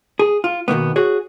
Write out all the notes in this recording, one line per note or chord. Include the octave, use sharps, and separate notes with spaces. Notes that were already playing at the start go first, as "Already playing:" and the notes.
G#4
F4
B2 D#3 A#3 B3
F#4 G#4 C#5